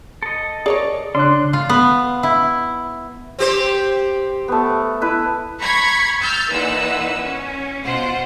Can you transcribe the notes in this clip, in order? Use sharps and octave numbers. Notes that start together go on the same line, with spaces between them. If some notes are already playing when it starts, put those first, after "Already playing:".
A4 D#5
G#4 A#4 C#5 D5
C#3 D4 C6 F#6
F4
B3
E4
C4 G4 C5
A3 B3
E4 B4 E5
A#5 B5 C#6 G#6 B6 C7
E6 F6 G6 A6
A#2 E3 D#4 B4 F#5 E6
C#4
B2 F4 C5 F#5